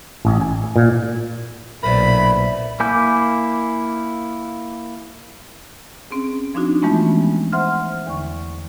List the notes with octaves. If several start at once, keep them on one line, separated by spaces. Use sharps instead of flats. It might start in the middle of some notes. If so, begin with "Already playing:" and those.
A1
G#5
A#2
B1 A#2 A#4 C5 D5 E5 B5
A#3 E4 G#5 D6 G6
C4 C#4 G#4
F3 C4 D4 D#4 F#4
E3 G#3 A3 B3 C#4 F4
C5 E5 F#5 C6 F6
E2 D3 C#6